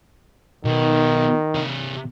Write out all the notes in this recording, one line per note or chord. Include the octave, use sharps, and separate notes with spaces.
B1 B2 D#3
C3 C#5